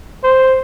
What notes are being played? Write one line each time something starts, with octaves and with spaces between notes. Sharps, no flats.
C5